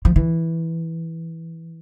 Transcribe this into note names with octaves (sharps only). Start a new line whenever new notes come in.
F3
E3